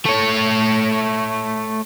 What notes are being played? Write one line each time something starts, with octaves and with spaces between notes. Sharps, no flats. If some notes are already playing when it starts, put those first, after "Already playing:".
A3 C#5